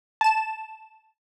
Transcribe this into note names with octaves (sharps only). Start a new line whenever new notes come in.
A5 E7